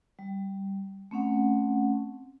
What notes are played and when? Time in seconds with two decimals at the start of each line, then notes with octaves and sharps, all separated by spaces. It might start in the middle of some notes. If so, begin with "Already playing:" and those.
0.19 G3
1.11 A3 C4 C#4 F#5